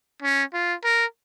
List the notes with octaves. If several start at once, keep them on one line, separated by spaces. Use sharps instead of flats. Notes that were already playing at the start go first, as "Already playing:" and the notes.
C#4
F4
A#4